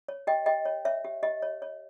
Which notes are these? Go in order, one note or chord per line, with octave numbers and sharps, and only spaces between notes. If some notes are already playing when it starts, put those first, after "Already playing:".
C#5
G4 D#5 G5
G4 D#5 G5
C#5
C#5 E5
G4
G4 D#5
C#5
C#5